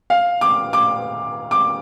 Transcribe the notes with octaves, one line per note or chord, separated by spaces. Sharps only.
F5
D6
D6
D6